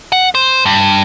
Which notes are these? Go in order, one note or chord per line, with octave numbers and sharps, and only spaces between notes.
F#5
C5
G2